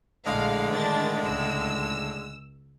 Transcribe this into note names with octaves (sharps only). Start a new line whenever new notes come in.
A#1 A2 D3 G#3 F5
D#3 D4 A6
C#2 E6